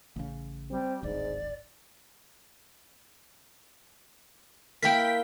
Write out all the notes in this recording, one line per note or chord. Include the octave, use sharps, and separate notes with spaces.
A1 C#3
G3 C4
D1 G#1 G#2 D5
A#3 E4 A#4 G5 B6